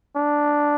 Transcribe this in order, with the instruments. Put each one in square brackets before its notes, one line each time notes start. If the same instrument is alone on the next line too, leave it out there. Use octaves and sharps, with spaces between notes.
[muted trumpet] D4